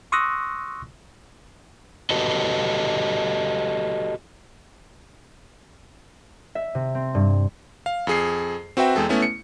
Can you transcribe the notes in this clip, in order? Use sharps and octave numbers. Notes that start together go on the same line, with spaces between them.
C6 C#6 D#6 E6 F#6 A#6
F#4 G4 A4 B4 D#5
E5
C3
C4
G2
F5
F2 G#4 C7
C4 F#4 B4 E5 G5
E2 G#3 G#4 A4 G5
A3 B3 C#4 E4
C#7